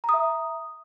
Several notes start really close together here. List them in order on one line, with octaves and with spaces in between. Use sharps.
A#5 D#6 E5